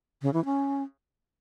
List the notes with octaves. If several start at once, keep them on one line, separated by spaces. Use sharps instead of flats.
C#3
E3
C#4